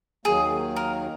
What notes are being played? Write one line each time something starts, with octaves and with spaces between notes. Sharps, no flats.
D#2 D#3 F#3 A#3 G#4
A#4